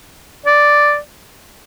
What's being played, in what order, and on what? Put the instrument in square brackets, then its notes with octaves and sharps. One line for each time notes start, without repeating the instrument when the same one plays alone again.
[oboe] D5